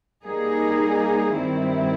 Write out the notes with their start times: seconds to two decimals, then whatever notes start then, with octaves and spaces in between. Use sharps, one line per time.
0.25 G3 A#3 D#4 G#4
1.34 G2 D#3 G3 C4 E4